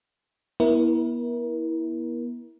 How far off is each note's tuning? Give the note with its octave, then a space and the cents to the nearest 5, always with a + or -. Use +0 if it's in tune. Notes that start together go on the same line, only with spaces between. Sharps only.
B3 -35 E4 -15 A#4 +30